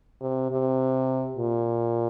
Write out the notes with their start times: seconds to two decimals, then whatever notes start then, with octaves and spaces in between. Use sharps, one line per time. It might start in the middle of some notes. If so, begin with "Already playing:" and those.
0.21 C3
0.51 C3
1.36 A#2